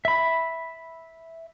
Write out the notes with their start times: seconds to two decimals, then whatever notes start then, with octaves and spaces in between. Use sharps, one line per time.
0.05 E5 B5